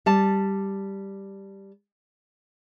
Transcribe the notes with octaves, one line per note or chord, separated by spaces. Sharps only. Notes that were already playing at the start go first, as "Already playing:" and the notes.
G3 A5